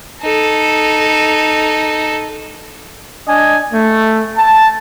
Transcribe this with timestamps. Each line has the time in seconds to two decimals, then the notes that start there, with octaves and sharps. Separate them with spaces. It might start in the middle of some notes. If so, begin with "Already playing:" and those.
0.21 D#4 A4
3.28 D4 D#5 G#5
3.73 A3
4.37 A5